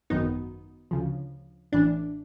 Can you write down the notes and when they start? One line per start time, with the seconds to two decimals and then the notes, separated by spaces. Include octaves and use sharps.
0.10 G#1 F#2 D#3 F#3 B3 D#4
0.91 D2 C#3 F3
1.72 A1 A2 E3 D4